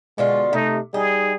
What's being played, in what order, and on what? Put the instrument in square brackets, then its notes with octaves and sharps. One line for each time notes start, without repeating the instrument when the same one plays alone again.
[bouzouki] B2 D3 F4 [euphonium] G#3
[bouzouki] C3 [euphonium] A3 [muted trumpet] D#4
[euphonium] G3 [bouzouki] D#4 [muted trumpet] G#4